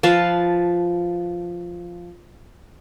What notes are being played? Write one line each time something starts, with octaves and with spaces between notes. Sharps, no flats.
F3 B4 F5 A5